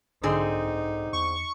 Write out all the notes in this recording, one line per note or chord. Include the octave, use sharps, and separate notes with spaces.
B1 G#2 D3 C4 D#4 G#4 A4
E2 C#6